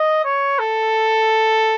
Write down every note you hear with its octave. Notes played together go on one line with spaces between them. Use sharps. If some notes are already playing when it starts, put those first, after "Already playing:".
Already playing: D#5
C#5
A4